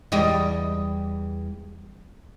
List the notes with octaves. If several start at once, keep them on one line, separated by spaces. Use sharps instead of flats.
E2 G3 D#5